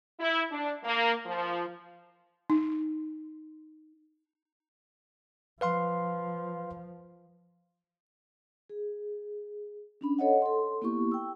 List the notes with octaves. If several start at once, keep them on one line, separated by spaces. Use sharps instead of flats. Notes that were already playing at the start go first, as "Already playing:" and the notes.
E4
D4
A#3
F3
D#4
F3 B4 F5 C6
G#4
C#4 D4 B5
A4 C#5 D#5 F#5
A4 C6
A#3 B3 E4 G4 C#6
G5 E6